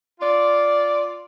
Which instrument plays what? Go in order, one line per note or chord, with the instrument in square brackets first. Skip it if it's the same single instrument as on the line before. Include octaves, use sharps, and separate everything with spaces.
[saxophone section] F4 D5